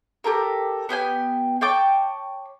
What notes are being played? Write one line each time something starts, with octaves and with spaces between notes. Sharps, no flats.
G4 A4 A#4
B3 G4 G5 G#5
C#5 G5 A5 D6